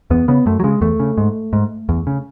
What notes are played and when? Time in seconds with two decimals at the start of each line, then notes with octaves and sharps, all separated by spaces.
0.10 E2 B3
0.28 C#3 B3
0.46 F#2 A3
0.60 F#3
0.64 C#3 G#3
0.81 E2 A3
1.00 C#3
1.18 G#2
1.53 G#2
1.89 E2
2.07 C#3